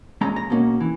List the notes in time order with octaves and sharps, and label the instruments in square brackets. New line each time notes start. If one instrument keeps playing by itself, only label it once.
[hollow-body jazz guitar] A#2 G#3 C#4 A#5
A#5
B2 A#3 C#4
E3